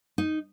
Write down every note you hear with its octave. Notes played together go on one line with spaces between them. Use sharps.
D#4